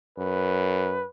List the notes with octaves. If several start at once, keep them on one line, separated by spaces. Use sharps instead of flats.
F#2 B4